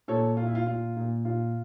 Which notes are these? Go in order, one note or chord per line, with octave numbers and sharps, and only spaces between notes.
A#2 A4 C#5
A#2 F4
E4
F4
A#2 F4
A#2
A#2 F4